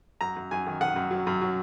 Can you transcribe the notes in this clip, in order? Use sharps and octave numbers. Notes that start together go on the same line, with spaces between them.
F#2 A#5
F#2
F#2 G#5
D#3
D#3 F#5
F#2
F#3
F#2
F#3